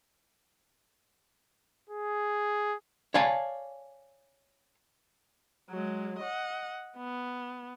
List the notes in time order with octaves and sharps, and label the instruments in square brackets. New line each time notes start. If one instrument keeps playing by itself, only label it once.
[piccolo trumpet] G#4
[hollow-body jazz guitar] C#5 D5 F5 G#5 A5
[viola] F#3 G#3
D#5 F#5
B3